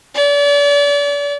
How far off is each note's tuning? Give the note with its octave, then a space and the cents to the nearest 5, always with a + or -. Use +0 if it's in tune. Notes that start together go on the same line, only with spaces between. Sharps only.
D5 -40